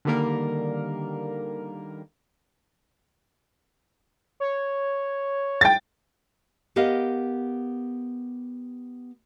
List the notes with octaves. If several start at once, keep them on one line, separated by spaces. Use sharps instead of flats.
D3 D#3 G3 A#3 A#4
C#5
G5 A6
B3 G4 A#4 D#5 F5